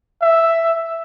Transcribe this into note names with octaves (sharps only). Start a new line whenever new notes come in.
E5